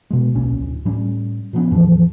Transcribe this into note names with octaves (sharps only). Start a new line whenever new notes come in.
B2 G#3
D1 B1 A#2 C#4
D1
A2 G3 C#4
A#2 F3 B3 C#4
E2 A2 E3 F3